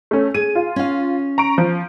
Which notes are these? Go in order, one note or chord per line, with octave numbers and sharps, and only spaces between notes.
A3 C#4
G#4 D#7
F4
C#4 F5
A#5 C#6 D7
F3